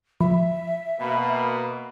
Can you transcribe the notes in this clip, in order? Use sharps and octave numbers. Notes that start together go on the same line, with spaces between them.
F3 E5
B2 A#3 B5